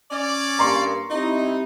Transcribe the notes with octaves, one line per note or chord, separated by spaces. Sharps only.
C#4 D5
G2 A#3 A#5 C6 C#6
G3 C4 D#4 E4